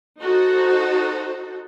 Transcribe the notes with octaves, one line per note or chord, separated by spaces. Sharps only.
D#4 F#4 A4 C5